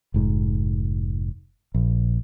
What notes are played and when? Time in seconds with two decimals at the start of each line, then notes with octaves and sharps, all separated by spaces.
0.14 F1 G#2
1.74 A#1